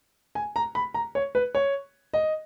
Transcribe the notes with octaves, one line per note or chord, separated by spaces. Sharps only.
G#5
A#5
B5
A#5
C#5
B4
C#5
D#5